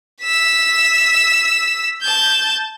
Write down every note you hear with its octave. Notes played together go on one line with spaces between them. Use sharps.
E6 B6
A5 G6